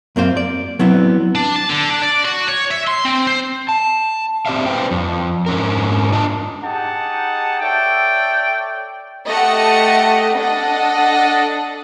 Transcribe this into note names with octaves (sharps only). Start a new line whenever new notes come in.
F#2 A#3 C4 C5 F5
D5
F#3 B3 C4 E4
D4
A5
D3
D4
D5
F#4
C#5
E5
C6
C4
C5
A5
C4 G4 D5 E5 F5
B4 C5 D5 G5
F2
G#2 C#4 A#4
D4 F4 D5 D#5 A5
D#4 G4 G#4 F#5 A5
A4 C#5 D5 E5 G5
A3 G4 D#5 F#5 A5 C#7
D4 A4 D#5 F#5